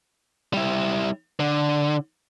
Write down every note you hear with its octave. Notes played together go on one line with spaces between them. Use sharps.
G3 E4
D3